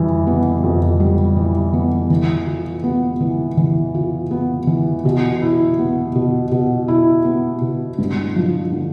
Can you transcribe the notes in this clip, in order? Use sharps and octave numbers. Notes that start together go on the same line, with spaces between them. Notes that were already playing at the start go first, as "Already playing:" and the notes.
Already playing: F2 E3 G3
B3
F2
G3
E3
B3
E3
F4
B3
E3
E3
F4
B3
E3
B2
E4
B3
B2
B2
E4
B3
B2
G2
F3
D3